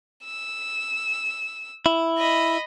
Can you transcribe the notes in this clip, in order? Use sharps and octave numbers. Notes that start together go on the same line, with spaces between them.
E6
E4
D#5 B5